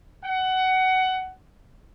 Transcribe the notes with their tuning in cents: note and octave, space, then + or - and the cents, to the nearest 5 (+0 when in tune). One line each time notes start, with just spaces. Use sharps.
F#5 +20